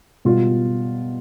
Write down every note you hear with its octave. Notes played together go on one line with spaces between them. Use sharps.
B2 G3 F4